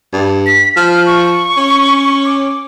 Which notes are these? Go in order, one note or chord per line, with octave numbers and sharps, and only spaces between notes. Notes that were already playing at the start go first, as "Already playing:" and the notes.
G2
B6
F3 F6
C#6
C#4
D6